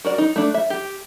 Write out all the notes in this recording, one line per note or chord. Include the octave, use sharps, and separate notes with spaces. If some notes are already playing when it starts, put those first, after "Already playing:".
F#4 A#4 D5
D#4
A3 D4
E5
G4